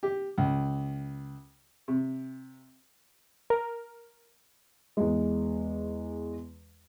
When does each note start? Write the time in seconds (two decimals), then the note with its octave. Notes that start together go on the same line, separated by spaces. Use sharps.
0.03 G4
0.38 C#2
1.88 C3
3.50 A#4
4.97 E2 G#3